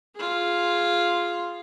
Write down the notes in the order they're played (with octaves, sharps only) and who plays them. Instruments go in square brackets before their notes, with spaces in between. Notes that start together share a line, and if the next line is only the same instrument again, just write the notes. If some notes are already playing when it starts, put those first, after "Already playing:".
[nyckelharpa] F4 G#4